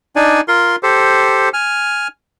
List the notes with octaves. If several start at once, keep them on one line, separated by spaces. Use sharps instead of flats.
D4 D#4 D5 G#5
F4 A#4 C6
G4 A4 C5
G#5 F6